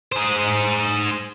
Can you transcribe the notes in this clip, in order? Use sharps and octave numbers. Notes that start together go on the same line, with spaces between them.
G#4 C5